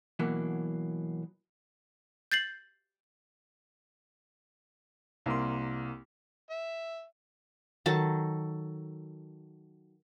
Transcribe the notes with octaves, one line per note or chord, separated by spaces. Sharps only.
B2 E3 F#3 A#3
G6 A6 C7 F#7
C2 A#3 A#4 C6
E5
D#3 F#3 A4 A5